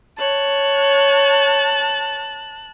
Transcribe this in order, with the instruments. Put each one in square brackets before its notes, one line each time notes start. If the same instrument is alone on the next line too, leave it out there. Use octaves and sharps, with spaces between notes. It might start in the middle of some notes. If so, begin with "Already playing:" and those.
[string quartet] C#5 [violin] A5 F#6